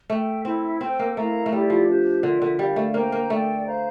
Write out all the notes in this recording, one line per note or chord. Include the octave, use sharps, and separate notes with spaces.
A3 A4 E5 G5
C4 E4 A4 E5
C4 A4 C5 G5
A#3
A3 E4 A#4 F5 A#5
A3
G3 E4 G4 D5
F3
D4 G4 C5
D3 F4 A#4 E5
D3
G3 A#4 D5 F5
A3
A#3 C5 G5 A#5
A#3
A3 A4 D5 G5
C5 F5 A#5